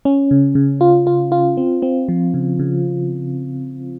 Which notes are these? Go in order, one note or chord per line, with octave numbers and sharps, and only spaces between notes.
C#4
C#3
C#3
F4
F4
F4
C4
C4
F3
C#3
C#3